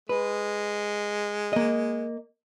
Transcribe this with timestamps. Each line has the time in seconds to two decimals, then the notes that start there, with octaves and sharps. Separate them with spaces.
0.09 G#3 B4
1.53 A#3 D#5